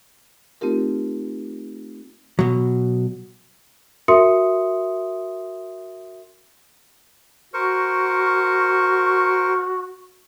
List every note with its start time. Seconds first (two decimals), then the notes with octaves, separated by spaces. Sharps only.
0.61 A3 C4 D#4 F4 G4 A#4
2.39 B2 F#3
4.08 F#4 A#4 E5 C6 D#6 C#7
7.54 F#4 A#4 C5 C#6